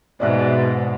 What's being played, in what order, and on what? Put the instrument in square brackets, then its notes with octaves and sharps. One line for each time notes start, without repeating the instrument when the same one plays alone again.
[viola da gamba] G#2 B2 [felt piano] D5 E5 F#6